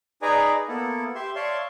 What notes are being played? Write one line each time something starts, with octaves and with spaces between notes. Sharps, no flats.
D#4 G#4 B4 D5 G#5 A#5
A#3 B3 E4 A4
G4 E5 C6
C#5 D5 E5 F5 A5 C6